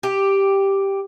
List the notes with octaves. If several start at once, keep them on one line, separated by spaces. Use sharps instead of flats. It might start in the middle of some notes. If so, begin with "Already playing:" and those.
G4